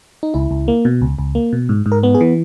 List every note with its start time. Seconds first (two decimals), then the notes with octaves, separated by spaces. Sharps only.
0.23 D#4
0.34 C#2 E4
0.51 C#2
0.68 A#3
0.85 B2
1.01 C#2
1.18 C#2
1.35 A#3
1.53 B2
1.69 G#2
1.86 G#2
1.92 A#4
2.03 B3
2.15 G#4
2.21 E3